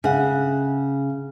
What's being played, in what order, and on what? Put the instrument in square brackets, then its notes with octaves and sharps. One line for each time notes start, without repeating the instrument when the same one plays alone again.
[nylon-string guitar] C#3 F#5